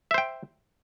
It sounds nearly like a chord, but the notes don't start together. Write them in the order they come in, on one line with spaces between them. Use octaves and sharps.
E5 C5 G5